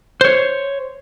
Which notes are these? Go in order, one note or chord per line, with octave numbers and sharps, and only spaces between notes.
C5 C#5